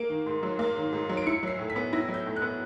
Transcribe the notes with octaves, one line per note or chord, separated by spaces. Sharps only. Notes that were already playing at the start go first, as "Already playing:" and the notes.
Already playing: A#3 D7
D#3
G#2
F#3
A#3
D#3
G#2
F#3
D7
E4 C#7
F#3 C7
A2
B6
B3
E4 A#6
F#3
G6
A2
F#6
B3